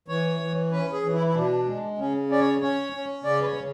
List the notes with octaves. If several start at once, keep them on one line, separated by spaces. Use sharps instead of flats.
E3 C#5
E3
C#4 B4
G#4
E3
E4
E4
B2 D4
G#3
C#3 C#4
C#4 D5
C#5
C#4 C#5
C#4
C#3 D5
B4
C#5
C#3